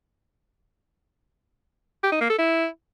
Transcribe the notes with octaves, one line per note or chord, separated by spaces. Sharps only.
G4
D#4
A#3
A4
E4